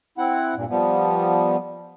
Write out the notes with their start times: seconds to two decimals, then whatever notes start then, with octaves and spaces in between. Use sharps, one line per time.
0.18 C4 E4 F#5
0.56 G2 A#2
0.70 F3 G3 B3